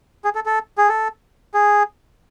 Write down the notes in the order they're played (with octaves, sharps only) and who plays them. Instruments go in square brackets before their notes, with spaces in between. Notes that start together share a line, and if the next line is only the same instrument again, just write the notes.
[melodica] G#4
A4
A4
G#4
A4
G#4